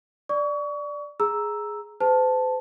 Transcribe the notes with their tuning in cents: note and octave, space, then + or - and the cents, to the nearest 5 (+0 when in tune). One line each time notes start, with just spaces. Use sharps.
D5 +0 C#6 +35
G#4 +5 A#5 +0 E6 +0
G#4 +0 C5 -45 A5 +0